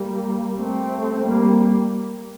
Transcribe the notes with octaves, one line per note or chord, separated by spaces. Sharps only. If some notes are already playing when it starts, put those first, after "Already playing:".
Already playing: G3 A#3
A3 C4
G3 A#3